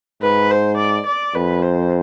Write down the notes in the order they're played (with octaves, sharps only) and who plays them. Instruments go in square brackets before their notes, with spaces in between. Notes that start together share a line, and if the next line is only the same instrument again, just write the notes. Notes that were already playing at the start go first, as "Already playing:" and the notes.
[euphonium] G#2 [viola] B4
[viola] C5
D5
D5
[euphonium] F2 [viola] B4
[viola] C5